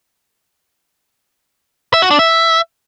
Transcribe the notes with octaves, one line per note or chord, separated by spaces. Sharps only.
E5
F#4
D4
E5